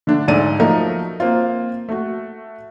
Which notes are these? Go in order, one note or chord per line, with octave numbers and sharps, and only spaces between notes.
D3 A3 D4
D2 G#2 A4 D5 D#7
F3 F#3 A3 D#4 A#4
A#3 C4 F4
A3 F#4